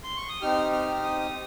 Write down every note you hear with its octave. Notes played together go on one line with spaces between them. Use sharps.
C6
C#6
D#6
C4 D#4 G4 F6
F6
D#6